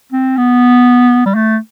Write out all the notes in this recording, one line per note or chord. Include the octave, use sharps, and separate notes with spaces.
C4
B3
G3
A3